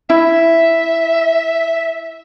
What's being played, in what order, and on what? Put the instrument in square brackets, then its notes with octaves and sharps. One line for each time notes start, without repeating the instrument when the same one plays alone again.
[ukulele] E4 [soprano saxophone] E5